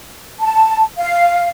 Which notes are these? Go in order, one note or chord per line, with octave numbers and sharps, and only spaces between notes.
A5
F5